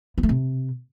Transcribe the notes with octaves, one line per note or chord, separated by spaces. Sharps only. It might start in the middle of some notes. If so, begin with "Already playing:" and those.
B3
A3
C3